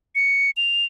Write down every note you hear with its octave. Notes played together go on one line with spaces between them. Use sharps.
C#7
F7